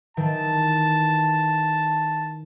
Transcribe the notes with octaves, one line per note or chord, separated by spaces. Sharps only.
D#3 E3 A5